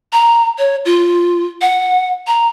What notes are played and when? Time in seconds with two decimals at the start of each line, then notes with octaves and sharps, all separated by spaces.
0.13 A#5
0.58 C#5
0.85 F4
1.62 F#5
2.27 A#5